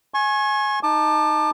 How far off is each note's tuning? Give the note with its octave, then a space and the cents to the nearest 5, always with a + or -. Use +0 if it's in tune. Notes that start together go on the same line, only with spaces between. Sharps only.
G#5 +15 C#6 -35
D#4 +0 A5 +0 D6 +30